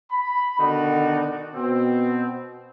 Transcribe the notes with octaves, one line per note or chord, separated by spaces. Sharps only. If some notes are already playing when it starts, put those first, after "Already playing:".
B5
B2 D3 D#3 D#4 F#4 D5
B2 C4